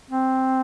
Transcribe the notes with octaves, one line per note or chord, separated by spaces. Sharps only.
C4